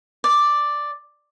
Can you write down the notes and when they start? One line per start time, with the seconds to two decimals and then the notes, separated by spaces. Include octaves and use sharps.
0.24 D5